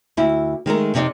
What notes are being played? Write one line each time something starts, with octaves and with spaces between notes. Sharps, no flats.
D2 E4
D#3 G#3 A3 A#4
F2 C3 D#4 D5